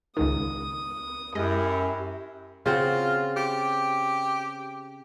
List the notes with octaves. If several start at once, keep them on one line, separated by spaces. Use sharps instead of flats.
C#2 G#2 D#3 D#6
F#2 G#3 E4 G4 D#5
C#3 C4 F4 F#4
G4